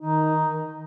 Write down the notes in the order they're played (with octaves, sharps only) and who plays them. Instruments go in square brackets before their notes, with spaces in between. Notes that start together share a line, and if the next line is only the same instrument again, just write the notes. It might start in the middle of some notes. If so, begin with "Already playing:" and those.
[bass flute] D#3 [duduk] D#4